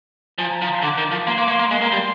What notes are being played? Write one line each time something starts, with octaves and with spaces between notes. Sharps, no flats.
F3 G#5
A#5
F3 A#5
C6
D3 D6
D#3
F3
A#3 C6
A#3 D6
A#3
C6
A#3
G#3 C6
A#3
G3